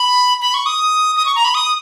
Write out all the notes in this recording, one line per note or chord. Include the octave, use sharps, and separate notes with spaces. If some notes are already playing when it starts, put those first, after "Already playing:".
Already playing: B5
B5
C#6
D#6
D#6
C#6
A#5
B5
D#6